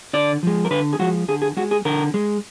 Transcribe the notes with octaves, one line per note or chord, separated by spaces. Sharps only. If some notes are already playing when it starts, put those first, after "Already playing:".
D3 D5
F3 G#3
A#4
D3 B4
G#4
F3 G#3 F#4
D3 G#4
G#4
G#3 F#4
G#4
D3 A#4
G#3